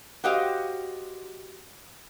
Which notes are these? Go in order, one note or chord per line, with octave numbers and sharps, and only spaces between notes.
F#4 G4 C5 D#5 F5 G5